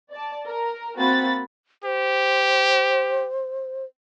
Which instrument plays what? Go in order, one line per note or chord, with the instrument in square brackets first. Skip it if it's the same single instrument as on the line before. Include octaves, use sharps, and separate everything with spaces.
[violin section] D5 A5
A#4
A#3 C4 F#4 B5 A6
[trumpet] G4 [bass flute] C5